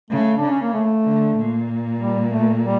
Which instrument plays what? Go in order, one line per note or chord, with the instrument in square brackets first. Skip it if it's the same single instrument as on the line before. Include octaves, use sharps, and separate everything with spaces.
[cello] C#3 [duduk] A3
[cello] C#3 [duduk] D4
[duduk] C#4
A#3
A3
[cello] D3
A#2
[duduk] G3
A3
G3